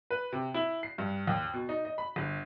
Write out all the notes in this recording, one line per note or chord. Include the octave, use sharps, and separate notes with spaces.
B4
C3
E4
C7
G2
D#2
B2
D#4
D#5
B5
G1